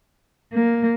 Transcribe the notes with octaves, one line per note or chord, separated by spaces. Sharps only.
A#3